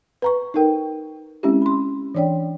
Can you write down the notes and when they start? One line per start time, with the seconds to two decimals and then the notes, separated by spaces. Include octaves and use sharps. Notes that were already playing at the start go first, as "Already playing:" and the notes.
0.22 B4 A#5 C#6
0.54 D#4 A4 A#4 G5
1.43 G#3 C4 C#4 E4 G4
1.62 B5 C6
2.15 E3 D4 C#5 D5 G5